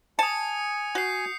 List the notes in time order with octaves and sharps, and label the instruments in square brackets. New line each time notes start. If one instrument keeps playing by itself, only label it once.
[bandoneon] G#5 [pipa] A5 [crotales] D#6 C#7
[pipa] F#4 [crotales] G6 C7